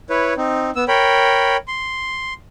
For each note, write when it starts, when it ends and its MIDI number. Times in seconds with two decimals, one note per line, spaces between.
0.10 0.34 64
0.10 0.34 71
0.10 0.34 73
0.37 0.71 60
0.37 0.71 63
0.76 0.84 59
0.76 0.84 88
0.88 1.57 70
0.88 1.57 73
0.88 1.57 79
0.88 1.57 83
1.68 2.34 84